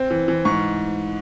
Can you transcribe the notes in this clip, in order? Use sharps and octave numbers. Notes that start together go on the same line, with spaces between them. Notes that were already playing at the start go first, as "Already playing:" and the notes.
Already playing: C4
E3
E3
G#2 C#6